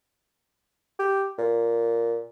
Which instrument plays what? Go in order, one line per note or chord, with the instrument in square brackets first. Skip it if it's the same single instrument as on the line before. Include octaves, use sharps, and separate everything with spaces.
[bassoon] G4
A#2